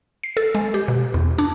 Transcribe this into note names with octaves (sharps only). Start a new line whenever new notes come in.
C7
A4
G#3
G4
B2
E2
D4